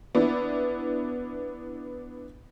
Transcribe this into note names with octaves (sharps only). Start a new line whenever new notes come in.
B3 D4 E4